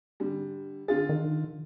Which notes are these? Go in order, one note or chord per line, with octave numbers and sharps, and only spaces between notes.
D3 G3
D3 F4 G#4 A6
D#3